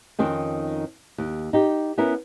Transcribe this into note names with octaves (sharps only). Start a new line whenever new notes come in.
F2 D#3 C4 C#4
D#2
D#4 G4
B3 C#4 E4 A#4